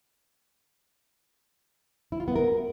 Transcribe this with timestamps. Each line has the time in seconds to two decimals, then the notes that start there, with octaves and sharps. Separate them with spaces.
2.12 E4
2.20 F4
2.28 B3
2.36 A#4